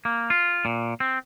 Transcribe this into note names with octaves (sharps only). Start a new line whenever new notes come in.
A#3
F4
A#2
C4